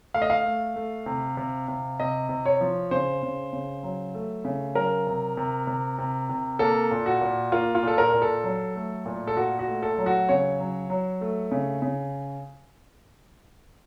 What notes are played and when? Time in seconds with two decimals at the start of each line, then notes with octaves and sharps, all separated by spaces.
0.14 A3 F5
0.22 D#5
0.30 F5
0.46 A3
0.76 A3
1.06 C3
1.37 C3
1.68 C3
2.00 C3 D#5
2.29 C3
2.46 C#5
2.61 F3
2.91 C#3 C5
3.22 C#3
3.53 C#3
3.83 F#3
4.14 A3
4.45 C#3
4.75 F#3 A#4
5.07 C3
5.37 C3
5.67 C3
5.98 C3
6.29 C3
6.59 A#3 A4
6.91 A#2
7.06 F#4
7.21 A#2
7.52 A#3 F4
7.75 F4
7.83 A#2 A4
7.98 A#4
8.13 A#2
8.22 A4
8.44 F#3
8.76 A3
9.06 A#2
9.27 A4
9.37 A#2 F#4
9.59 F#4
9.67 A3
9.83 A4
9.98 F#3
10.06 F#4
10.29 C#3 C#5
10.60 F#3
10.90 F#3
11.21 A3
11.51 C#3
11.82 C#3